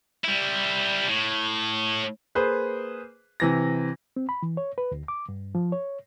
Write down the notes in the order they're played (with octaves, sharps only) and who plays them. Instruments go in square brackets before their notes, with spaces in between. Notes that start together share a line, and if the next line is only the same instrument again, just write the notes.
[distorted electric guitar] G3 E4
A2
[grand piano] A#3 G#4 B4 C5
C3 E3 A#6
[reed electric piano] C4
B5
E3
C#5
B4
D2
D6
G2
F3
C#5